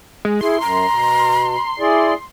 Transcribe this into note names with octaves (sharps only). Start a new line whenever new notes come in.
G#3
E4 G#4 C6
F#2 A#5 C6
B2
E4 G#4 D5